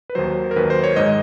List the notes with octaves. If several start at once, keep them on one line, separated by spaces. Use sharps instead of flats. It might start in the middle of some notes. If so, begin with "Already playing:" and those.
B4
D#2 D#3 F#3 C5
A#4
D#2 D#3 F#3 B4
C5
C#5
G#2 D#3 G#3 D#5